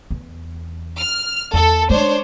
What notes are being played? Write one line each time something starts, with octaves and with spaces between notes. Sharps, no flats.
E2
F6
E2 A4
G#3 C#4 D4 C5 C#5